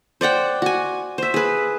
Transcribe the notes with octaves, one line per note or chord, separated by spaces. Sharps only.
C5 D5 F#5 G5
F#4 G#5
C5 E5
G#4 B4